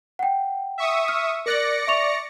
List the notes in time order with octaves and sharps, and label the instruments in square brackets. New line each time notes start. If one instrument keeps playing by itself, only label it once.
[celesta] F#5 G5
[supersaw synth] E5 C#6 D#6
[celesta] F6
[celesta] A#4 F#6 F#7 [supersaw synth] D5 A#6 C#7
[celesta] E5 C#6 F7